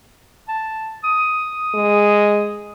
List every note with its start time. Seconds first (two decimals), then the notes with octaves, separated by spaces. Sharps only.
0.48 A5
1.04 D#6
1.74 G#3